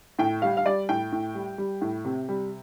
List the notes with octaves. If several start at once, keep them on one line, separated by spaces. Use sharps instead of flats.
A2 G5
G3 F5
F5
G3 D5
A2 G5
A2
G3
G3
A2
C3
G3